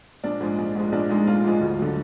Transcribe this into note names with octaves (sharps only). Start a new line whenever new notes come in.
A#1 D4
G#2 F3 G#3
A#1
G#2 F3 G#3
A#1 D4
G#2 F3 G#3 D#4
A#1 F4
G#2 F3 G#3
D2
D3 F#3